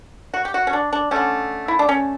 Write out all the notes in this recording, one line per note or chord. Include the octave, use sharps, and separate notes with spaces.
F#4
G4
F#4
C#4
D4
D4
D3 A3 C#4
E4
D4
C#4